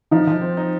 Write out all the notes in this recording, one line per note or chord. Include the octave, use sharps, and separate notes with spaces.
F3 D#4
F3
C4
D#4